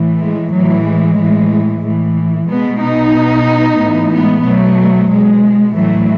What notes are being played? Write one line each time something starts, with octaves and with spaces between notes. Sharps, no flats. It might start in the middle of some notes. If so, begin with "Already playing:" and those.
Already playing: A2 E3
G#3
A2 E3 F#3
G#3
A2 E3
A2 E3
B2 G#3 B3
B3 D#4
B2
A2 E3
G#3 B3
B2 F#3 A3
B2 G#3
A2 E3 F#3 A3